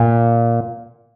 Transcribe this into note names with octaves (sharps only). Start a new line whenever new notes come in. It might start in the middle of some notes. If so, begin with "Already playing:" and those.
Already playing: A#2